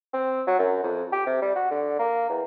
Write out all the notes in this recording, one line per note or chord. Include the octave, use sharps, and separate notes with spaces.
C4
F#3
F#2
F2
G4
C3
G3
F#4
D3
A#3
E2